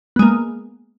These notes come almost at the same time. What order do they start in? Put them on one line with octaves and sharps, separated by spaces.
B3 G#3 A#3